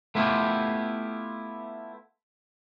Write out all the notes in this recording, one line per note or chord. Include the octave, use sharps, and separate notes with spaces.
A3 B3 E4 F4 G4